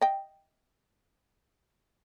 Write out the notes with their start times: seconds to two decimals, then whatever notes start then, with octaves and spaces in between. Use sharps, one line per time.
0.01 D#5 G5